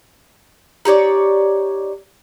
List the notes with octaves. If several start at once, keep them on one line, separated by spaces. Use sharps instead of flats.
D#4 G4 C#5 D5